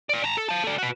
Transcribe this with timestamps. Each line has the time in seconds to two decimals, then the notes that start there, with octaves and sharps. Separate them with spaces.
0.09 D5 F5
0.24 A5 A#5
0.37 A4
0.48 F5 A5
0.64 A3 D5
0.78 F#4 B4